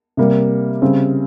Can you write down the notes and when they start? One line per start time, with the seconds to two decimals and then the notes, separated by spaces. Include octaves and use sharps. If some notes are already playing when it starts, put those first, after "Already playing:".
0.17 C3 G3 A#3
0.82 C#3 G3 C4